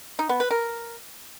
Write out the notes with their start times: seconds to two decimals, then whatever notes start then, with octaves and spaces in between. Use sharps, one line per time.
0.19 D#4
0.29 B3
0.40 B4
0.51 A#4